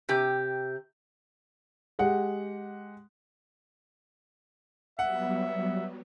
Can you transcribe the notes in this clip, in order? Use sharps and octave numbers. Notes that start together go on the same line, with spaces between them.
C3 G4
G#3 G4 F#5
F#3 G3 B3 E5 F#5